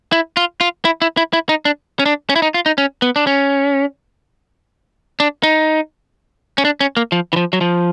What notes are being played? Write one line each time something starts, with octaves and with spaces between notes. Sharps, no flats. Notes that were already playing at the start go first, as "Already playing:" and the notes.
E4
F4
F4
E4
E4
E4
E4
D#4
D4
C#4
D4
C#4
E4
D#4
F4
D#4
C#4
B3
D4
C#4
D4
D#4
C#4
D4
C#4
A#3
F3
E3
F3
F#3
F3